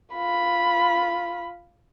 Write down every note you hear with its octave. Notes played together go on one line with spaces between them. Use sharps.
F4 B5